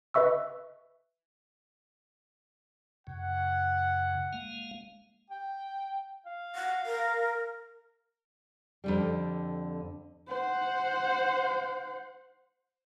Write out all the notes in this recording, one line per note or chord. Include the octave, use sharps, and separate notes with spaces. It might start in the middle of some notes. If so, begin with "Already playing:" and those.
B4 D#5 E5 C#6 E6
F#2 C#3 F#5
G#3 A#3 F5
G5
F5
F#5
A#4
F2 D3 G3
C5 F#5